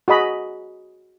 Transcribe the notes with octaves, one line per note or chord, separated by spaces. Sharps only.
F#4 G#4 D#5 B5